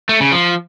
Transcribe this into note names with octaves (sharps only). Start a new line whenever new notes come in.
A3
C#3
F3